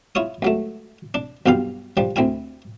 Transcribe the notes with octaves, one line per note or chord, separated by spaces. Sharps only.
E4 F4 C#5 D#6
C#2 F#3 A3
D4
B1 G2 B2 F4 G4 F5
F3 G3 D4
D2 C4 E4 G#5